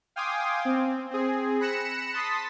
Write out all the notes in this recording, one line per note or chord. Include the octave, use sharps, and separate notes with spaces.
F5 G5 G#5 C6 D6 D#6
C4
C4 G#4
B5 F#6 A#6 C#7 E7
A5 C6 D#6 A6 B6